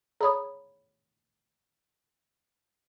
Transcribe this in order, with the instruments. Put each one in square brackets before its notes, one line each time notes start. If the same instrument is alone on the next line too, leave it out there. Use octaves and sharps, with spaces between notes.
[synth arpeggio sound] G#4 C#5 [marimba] A#5 B5 D#6